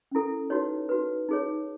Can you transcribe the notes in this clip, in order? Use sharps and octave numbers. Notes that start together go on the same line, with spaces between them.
C#4 E4 A4
D#4 F#4 B4 C#5
D#4 F#4 B4
D#4 G#4 C#5